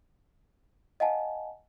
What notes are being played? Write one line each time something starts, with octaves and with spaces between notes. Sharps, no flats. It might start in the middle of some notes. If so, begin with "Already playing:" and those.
D#5 F5 F#5 G#5 A5